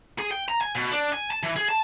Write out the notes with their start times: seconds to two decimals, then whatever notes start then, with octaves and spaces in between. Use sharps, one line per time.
0.19 G#4
0.31 G5
0.48 A#5
0.61 G#5
0.75 B2
0.92 D4
1.13 G#5
1.31 A5
1.43 E3
1.56 G#4
1.69 A5